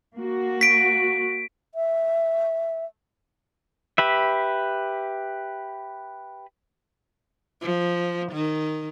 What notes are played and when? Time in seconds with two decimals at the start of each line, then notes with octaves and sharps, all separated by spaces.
0.16 A#3 F#4
0.61 B6 D7
1.75 E5
3.98 G4 B4 E5
7.61 F3
8.32 D#3